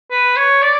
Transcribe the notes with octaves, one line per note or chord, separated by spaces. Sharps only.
B4
C#5
D5